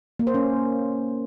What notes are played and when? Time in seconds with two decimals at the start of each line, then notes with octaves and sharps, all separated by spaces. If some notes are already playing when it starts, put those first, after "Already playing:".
0.19 A#3
0.27 C5
0.34 C#4